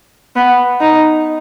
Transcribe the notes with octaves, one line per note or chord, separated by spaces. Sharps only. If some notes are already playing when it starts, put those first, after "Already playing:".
B3
D#4